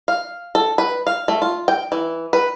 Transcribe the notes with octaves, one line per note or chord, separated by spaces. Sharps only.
F5
A4
B4
F5
A3
F4
G5
E3
B4